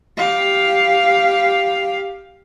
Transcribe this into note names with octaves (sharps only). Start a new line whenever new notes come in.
G4 F5